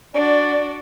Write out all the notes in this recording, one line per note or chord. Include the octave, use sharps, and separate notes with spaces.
D4 F#4 D5